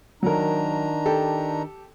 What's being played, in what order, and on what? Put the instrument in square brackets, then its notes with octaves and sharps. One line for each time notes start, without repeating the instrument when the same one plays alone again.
[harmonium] D#3 D4 A#5 [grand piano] F#3 A#4
[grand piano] G4 A4